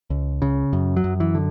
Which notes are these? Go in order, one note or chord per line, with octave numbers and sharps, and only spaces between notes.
C#2
C#3
F#2
F#3
F#2
E3
D3